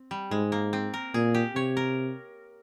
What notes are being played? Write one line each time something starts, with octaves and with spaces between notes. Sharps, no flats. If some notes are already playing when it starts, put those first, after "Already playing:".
Already playing: C4
G3
G#2 G#3
A#3
C4
A#4
A#2 G#4
G4
C3 C#5
A#4